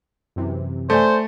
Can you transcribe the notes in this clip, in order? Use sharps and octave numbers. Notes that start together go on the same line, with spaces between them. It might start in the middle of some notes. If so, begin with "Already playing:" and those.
F#2 C3 E3
A3 A4 C5 D5 G#5